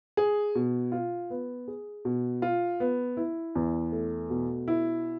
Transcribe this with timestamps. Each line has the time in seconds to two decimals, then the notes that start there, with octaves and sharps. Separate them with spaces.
0.17 G#4
0.55 B2
0.92 F4
1.30 B3
1.68 G#4
2.05 B2
2.42 F4
2.80 B3
3.17 E4
3.55 E2
3.92 A3
4.30 B2
4.68 E4